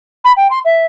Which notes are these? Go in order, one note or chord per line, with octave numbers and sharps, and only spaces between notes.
B5
G5
C6
E5